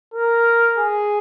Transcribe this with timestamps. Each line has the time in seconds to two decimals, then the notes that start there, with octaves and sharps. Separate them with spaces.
0.14 A#4
0.78 G#4